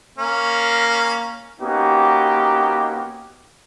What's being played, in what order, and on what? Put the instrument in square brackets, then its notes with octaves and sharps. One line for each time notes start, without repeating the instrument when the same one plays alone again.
[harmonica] A#3 C#4
[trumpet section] A#3 B3 C#4 D#4 F#4 G4